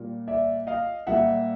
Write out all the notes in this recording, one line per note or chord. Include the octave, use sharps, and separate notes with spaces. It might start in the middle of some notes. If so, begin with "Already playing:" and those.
Already playing: A#2 G3
D5 E5
D#5 F5
A#2 G3 E5 F#5